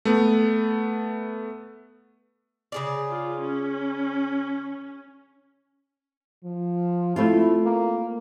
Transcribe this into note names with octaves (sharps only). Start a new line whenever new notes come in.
A3 B3
C#3 G#4 D5
F4
C#4
F3
A3 C4 E4 F4
A#3